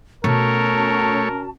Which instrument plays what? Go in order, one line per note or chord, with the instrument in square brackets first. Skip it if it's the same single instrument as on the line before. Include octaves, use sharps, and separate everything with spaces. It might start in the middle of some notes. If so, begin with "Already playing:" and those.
[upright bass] B2 [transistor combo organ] A3 C#5 [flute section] C#4 F#4 A5 [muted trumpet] A#4